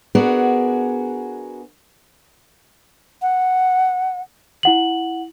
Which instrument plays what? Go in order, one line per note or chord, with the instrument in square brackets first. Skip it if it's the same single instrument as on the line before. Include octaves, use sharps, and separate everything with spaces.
[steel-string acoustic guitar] B3 D4 F#4 G#4 A#4
[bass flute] F#5
[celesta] E4 F#5 F#7